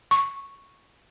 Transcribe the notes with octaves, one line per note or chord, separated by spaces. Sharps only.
C#6